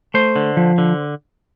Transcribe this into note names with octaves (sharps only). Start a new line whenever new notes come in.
A3 C5
D3
F3
D3